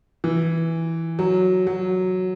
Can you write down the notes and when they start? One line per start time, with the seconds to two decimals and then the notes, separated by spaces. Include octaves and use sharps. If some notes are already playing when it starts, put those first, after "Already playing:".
0.24 E3
1.19 F#3
1.67 F#3